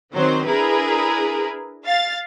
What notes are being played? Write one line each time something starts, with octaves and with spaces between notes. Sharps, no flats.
D#3 F#3 C4 C5
D4 E4 G#4 A#4 B4
F5 A6